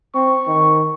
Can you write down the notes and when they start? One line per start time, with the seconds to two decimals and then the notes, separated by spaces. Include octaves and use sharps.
0.15 C4 C#6
0.47 D#3